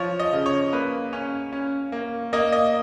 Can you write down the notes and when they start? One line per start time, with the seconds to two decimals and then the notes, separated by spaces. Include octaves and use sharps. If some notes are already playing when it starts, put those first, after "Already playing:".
Already playing: F3 C#5
0.19 D#5
0.33 C#3
0.46 C#5
0.73 A#3 B4
1.13 C#4 C#5
1.53 C#4
1.92 A#3
2.33 A#3 D#5
2.52 D#5